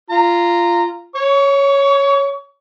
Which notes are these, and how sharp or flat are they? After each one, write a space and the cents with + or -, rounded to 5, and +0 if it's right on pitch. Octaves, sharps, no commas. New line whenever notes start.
F4 -15 A#5 -10
C#5 +0 C#6 +30